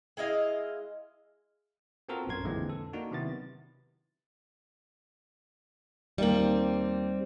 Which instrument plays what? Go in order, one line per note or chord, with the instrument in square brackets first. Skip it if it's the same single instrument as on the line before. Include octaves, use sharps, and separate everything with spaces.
[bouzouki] G#3 E4 D#5 F5
[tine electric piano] B3 C4 F4 F#4 A4 A#4
A#1 F#2 A#4 C6 G#6
F2 A#2 D3 E3 G#3 C4
A4
A#3 D4 D#4 F#4
C3 D#3 F#3 B3 E4 A6
[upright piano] D#2 A#3 F#7 [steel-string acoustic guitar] G3 C4